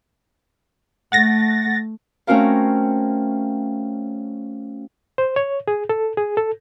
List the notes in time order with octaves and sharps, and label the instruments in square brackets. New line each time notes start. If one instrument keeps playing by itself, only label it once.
[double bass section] A3 [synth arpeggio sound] F#5 A6 A#6
[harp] A3 C4 C#4 F#4 A#4 F5
[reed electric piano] C5
C#5
G#4
A4
G#4
A4